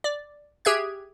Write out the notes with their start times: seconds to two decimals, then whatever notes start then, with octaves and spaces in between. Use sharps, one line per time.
0.04 D5
0.65 G4 G#4 E5 F#6 G#6